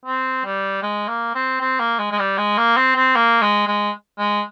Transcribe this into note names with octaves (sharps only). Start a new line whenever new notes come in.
C4
G3
G#3
A#3
C4
C4
A#3
G#3
G#3
G3
G#3
A#3
C4
C4
A#3
G#3
G#3
G#3